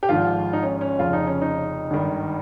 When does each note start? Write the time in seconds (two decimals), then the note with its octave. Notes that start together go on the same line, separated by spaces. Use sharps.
0.03 G4
0.09 G#1 G#2 F3 F4
0.53 D#4
0.63 C#4
0.81 C#4
0.99 F1 F2 C#3 F3 F4
1.13 D#4
1.27 C#4
1.41 D#4
1.91 G#1 G2 D#3